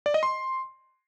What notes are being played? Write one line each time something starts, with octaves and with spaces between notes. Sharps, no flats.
D5
D#5
C6